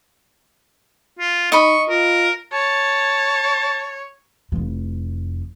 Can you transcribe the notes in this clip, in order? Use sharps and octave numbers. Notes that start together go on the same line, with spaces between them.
F4
D#4 D#5 B5 C#6
F4 A#4
C#5 A5
F1 E3